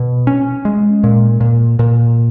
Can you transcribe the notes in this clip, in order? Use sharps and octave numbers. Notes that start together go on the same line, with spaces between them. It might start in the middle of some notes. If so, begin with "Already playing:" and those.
Already playing: B2
C#4
G#3
A#2
A#2
A#2